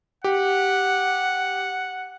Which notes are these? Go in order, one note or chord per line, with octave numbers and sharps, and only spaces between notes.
G4 F#5